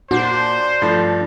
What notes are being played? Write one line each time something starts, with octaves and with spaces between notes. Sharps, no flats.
A#2 D4 F#4 C5
G2 F3 A3